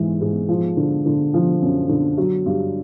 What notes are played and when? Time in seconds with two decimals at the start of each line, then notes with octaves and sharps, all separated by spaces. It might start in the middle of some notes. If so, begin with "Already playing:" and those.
Already playing: G#2 E3 G#3
0.21 G#2
0.49 F3
0.77 D3
1.06 D3
1.34 F3
1.62 F#2
1.89 D3
2.18 F#3
2.46 G2